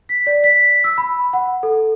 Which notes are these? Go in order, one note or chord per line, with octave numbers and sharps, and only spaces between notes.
B6
D5
B6
E6
B5
F#5
A4